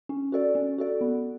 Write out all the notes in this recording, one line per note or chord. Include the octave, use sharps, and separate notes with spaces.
C#4
F#4 A4 D5
C#4
F#4 A4 D5
B3